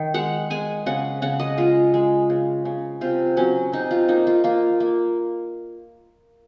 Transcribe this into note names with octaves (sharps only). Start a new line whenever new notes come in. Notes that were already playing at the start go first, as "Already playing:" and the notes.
Already playing: D#3
G#3 F#5
G#3 G#5
C#3 F#5
C#3 F#5
D#5
G#3 F4
G#3
C#3
C#3
C3 F4
F#3 C#4
C3 D#4
F4
A#3 D#4
F4
A#3 F4
A#3